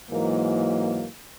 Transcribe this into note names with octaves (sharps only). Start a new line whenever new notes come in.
G#2 E3 F#3 A#3